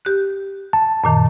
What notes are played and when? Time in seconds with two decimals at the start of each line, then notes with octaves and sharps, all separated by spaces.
0.05 G4 F#6
0.73 A5
1.04 F#2 A#2 D#3